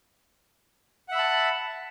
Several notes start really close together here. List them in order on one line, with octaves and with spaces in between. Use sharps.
F#5 E5 B5 A5